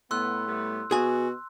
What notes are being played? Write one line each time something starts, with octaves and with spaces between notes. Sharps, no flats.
A2 B3 C6 E6 F#6
G3 A3 B3
B2 F#4 G#4 G#5